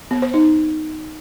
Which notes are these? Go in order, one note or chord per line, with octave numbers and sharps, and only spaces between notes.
B3
C5
D#4